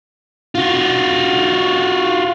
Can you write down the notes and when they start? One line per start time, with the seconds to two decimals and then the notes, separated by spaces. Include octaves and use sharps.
0.55 F4 F#4